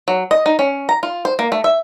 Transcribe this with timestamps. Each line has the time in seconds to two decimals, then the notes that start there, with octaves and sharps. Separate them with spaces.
0.08 F#3
0.31 D#5
0.46 D#4
0.59 C#4
0.89 A#5
1.03 F4
1.25 C5
1.39 A#3
1.52 A3
1.64 E5